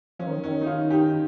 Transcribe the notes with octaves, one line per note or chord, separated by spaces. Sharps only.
F3 C#4
D#3
D#3 C#4
D#4
C#4 F4
D#4 G4